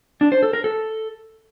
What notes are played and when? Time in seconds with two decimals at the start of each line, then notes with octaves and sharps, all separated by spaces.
0.21 D4
0.32 C5
0.43 A4
0.53 A#4
0.64 A4